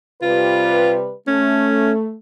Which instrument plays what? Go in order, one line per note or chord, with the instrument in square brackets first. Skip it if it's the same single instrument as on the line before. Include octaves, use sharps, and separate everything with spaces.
[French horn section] C3 G3 B4 [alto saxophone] F4
[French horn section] A3 [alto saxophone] C#4